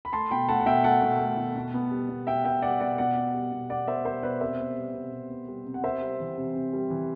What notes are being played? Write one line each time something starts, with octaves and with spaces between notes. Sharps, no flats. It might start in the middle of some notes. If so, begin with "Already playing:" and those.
B5
A3 A5 C6
B2 G5 B5
A3 F#5 A5
F#5
B2 E5 G5
A3 F#5 A5
B2
A3
B2
B2
B3
G3
B2
B2 E5 G5
B3 E5 G5
G3 D5 F#5
B2 D5 F#5
B2 D5 F#5
B3
G3
B2
B2 D5 F#5
B3 C5 E5
G3 C5
B2 B4 D5
C3 C5 E5
B3
G3
C3
C3
B3
G3
C3
F#5
C3 C5 E5
G3
E3
C3
C3
G3
E3